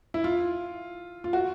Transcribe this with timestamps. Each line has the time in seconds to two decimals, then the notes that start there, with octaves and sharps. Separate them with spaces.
0.14 E4
0.24 F4
1.24 F4
1.33 F#4